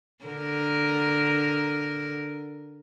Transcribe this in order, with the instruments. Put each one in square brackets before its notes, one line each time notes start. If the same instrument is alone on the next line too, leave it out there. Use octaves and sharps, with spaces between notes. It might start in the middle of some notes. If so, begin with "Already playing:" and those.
[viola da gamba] D3 A#4